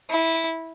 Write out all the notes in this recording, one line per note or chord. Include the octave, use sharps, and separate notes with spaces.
E4